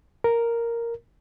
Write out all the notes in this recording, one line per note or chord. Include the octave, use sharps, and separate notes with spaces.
A#4